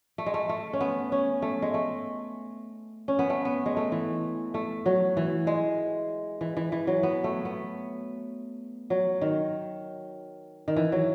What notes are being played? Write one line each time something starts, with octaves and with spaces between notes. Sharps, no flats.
A3
G#3
A3
A3
C#4
B3
C#4
A3
G#3
A3
C#4
B3
A3
B3
G#3
A3
E3
A3
F#3
E3
G#3
E3
E3
E3
F#3
B3
A3
B3
F#3
D#3
D#3
E3
F#3